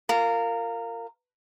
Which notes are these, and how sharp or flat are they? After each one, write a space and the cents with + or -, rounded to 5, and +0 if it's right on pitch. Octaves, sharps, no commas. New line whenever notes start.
F4 +0 A#4 -20